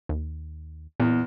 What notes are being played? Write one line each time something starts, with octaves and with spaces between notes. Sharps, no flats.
D#2
E2 A#2